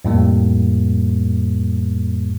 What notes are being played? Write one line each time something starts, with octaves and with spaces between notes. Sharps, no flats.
F2 A2 G3 A#3